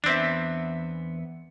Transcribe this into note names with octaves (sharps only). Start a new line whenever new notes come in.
E2 B3 C4 D4 E5